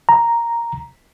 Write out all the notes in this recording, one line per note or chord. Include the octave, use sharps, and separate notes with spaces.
A#5